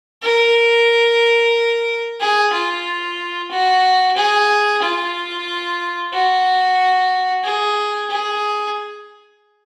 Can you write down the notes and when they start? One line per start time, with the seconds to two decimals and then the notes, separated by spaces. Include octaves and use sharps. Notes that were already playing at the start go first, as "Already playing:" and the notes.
0.23 A#4
2.20 G#4
2.53 F4
3.51 F#4
4.17 G#4
4.82 F4
6.13 F#4
7.44 G#4
8.10 G#4